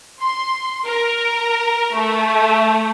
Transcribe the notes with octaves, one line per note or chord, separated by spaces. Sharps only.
C6
A#4
A3